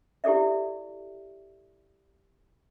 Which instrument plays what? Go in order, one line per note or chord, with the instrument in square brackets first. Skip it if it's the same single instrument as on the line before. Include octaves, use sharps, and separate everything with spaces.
[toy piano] E4 G4 A4 D5 E5